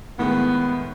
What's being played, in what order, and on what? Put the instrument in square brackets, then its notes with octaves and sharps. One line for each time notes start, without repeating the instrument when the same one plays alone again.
[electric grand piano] A2 D#3 G#3 [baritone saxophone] B3